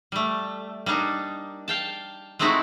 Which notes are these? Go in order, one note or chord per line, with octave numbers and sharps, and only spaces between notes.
G3 A3
G3 A#3 D4 D#4
F5 G5 A5
G#3 A3 C4 D#4 E4 F#4